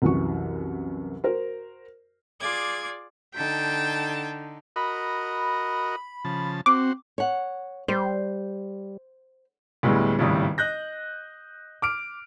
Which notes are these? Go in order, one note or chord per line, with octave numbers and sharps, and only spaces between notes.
C2 F#2 E3 F#4 C#6
F#4 A#4 C5
F4 G#4 D5 D6 G#6
D3 D#4 G5 A5
F#4 A#4 D#5 B5
C#3 F3 A5
C4 F#4 C5 D6
C#5 F#5
G3 C5
D2 A2 G3 G#3 B3
G#1 C#2 A2 G3 E4 D#6
D#5 F#6 G6 A#6
D6 F6 D7